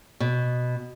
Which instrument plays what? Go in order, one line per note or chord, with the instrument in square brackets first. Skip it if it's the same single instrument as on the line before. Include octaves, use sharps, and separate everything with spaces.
[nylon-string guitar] B2